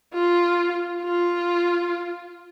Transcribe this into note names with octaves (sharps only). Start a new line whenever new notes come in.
F4
F4